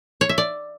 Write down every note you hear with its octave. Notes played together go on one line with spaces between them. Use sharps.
C#5
E5
D5